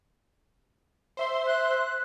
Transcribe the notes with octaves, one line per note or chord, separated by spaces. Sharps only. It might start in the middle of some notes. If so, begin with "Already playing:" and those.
C5 E5 C6
F#6